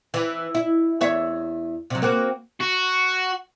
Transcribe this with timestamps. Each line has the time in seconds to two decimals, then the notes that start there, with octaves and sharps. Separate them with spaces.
0.14 E3
0.55 E4
1.01 E2 C#5 E5
1.90 C3 F#3
2.02 A#3 C4 F#4
2.61 F#4